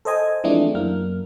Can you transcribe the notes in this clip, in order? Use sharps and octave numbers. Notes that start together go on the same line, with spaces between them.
A4 C5 D#5 G#5
E3 F3 G#3 A3 C4 D4
F#2 A#3 F6